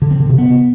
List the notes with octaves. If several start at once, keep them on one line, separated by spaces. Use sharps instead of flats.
D3
C4
D3
C3
B3